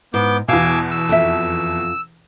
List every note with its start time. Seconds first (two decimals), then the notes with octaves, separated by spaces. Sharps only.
0.14 G#2 B3 D6 G6
0.48 E2 B2 F5 G#5 D6 E6
0.91 E6
1.09 F2 E5